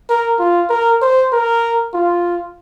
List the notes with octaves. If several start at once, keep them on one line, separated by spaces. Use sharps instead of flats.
A#4
F4
A#4
C5
A#4
F4